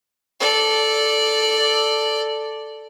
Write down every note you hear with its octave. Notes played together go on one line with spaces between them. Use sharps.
A4 D5